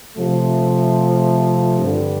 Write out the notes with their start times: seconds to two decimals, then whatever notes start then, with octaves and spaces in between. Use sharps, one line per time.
0.16 C3 F3 A3
1.81 G2 D3 G3